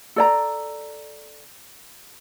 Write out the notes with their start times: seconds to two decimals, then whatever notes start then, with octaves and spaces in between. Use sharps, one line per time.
0.16 A4 D5 A#5